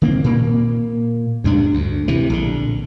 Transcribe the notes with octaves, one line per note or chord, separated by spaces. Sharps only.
D#3 A#3 C4
A#2 A#3
D2 G2 D4
D2
C3 E3
A#1 D3